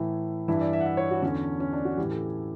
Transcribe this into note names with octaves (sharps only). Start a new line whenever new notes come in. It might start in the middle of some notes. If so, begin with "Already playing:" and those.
Already playing: A2 E3 E4
G2 E3 E4
D5
E5
F#5
E5
C#5
F#4
E2 D3 C#4
C#4
D4
F#4
A2 E3 G4
A4